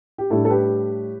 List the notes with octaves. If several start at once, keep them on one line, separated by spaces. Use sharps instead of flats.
G4
A2 G3 D4 E4 A4
A4
G4 B4